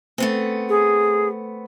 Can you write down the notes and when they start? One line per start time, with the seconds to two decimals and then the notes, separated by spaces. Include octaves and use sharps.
0.18 A3 B3 C4
0.69 G#4